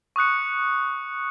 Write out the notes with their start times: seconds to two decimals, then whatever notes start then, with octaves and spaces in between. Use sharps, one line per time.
0.16 C#6 D#6 F#6 C#7